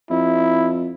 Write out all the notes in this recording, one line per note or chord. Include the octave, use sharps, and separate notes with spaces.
F2 E4